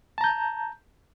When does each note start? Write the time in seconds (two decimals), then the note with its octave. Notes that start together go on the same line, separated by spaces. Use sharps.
0.18 A5
0.21 A#5
0.24 G6